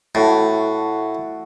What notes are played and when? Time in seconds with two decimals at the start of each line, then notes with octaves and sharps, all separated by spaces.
0.15 A2 A3 F#4